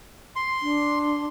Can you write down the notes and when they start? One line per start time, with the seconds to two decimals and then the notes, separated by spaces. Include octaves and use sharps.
0.36 C6
0.62 D4